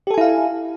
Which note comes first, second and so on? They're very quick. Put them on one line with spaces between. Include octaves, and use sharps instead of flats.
G4 A4 G#5 E4 F5